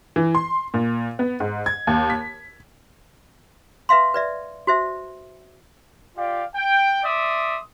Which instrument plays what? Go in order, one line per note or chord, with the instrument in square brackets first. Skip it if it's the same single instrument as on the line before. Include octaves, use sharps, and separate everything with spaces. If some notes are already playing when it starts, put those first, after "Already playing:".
[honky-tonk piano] E3
C6
A#2
B3
G#2
G#6
D#2
B6
[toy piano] B4 E5 F5 C6
B4 D5 E5
F#4 C5 E5
[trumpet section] F4 G4 D5 F5
G5
D5 E5 C6 D#6